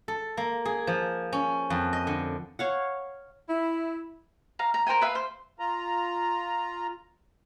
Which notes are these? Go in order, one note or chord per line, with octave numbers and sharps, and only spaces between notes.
A4
A#3
G#4
F3
C#4
F2
D#5
D3
C#5 F5 F#5
E4
F5 A#5
A#5
A#4 C5 G5 G#5
B4 E5 F5
C5
F4 A#5